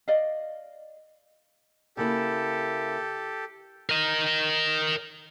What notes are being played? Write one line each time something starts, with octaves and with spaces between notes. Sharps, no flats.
D5 D#5 F5
C#3 A#3 E4 G4 A4
A#4 D#5